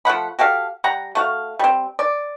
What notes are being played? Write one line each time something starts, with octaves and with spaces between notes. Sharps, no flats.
F3 A3 F#5 B5
F#4 G4 A4 F5
G3 F#5 A#5
A3 F#4 F5
G3 C4
D5